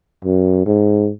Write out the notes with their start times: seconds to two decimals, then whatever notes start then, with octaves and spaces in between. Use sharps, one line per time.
0.25 F#2
0.66 G#2